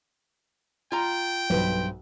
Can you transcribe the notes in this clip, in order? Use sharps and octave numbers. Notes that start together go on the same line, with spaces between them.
F4 G5 A#5
B1 G2 B4 C5